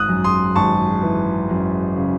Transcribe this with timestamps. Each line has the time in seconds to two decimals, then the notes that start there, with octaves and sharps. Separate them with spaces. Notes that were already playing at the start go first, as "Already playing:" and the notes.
Already playing: G#1 D#6 F#6
0.09 F#2
0.24 C6 D#6
0.56 G#1 A5 C#6
1.02 E3
1.49 F#2
1.96 C#3